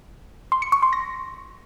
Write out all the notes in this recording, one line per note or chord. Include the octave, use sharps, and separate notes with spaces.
C6
C#7
C#6
C6
A#6